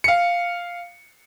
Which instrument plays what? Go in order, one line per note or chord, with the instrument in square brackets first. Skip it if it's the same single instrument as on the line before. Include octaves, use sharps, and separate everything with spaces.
[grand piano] F5 C#7